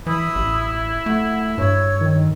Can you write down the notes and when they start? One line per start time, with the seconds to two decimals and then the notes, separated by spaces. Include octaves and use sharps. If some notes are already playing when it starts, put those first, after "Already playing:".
0.07 E3 E4 B5 D#6 E6
0.36 A1
1.06 A3 F#5
1.58 G2 C#5 E6
2.01 D#3